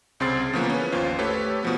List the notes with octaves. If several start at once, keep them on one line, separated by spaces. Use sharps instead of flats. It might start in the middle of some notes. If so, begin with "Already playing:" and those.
C2 C#3 C4 C6 A6 C7
C#3 E3 F3 A#3 B3
C#4 B4
G1 D#2 F4 C5
A3 G4 A4 B4 C#5
B2 F3 B3